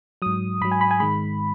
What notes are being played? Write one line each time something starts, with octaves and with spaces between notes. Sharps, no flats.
G#2 F#3 D#6
G#2 F#3 B5
G#5
B5
G#5
G#2 D#3 G#3 B5